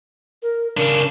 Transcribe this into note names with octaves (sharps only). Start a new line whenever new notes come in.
A#4
C#3 D4 A#4